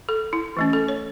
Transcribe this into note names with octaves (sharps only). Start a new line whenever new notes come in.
A4
E4
E3 A3 C#4
A4
C#5